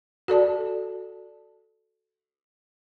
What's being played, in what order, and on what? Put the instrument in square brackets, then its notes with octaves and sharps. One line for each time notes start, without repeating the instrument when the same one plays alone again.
[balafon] F#4 A4 D5 A5